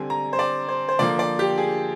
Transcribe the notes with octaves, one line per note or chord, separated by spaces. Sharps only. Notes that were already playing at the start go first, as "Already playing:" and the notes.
Already playing: D3 G3 C4 G#5
A#5
C5
D5
C5
C5
D3 F3 A#3 D5
D5
G4
G#4